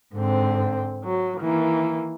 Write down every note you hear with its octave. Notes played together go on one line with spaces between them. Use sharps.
G#2 D3 C4
F#3
D#3 E3 A#3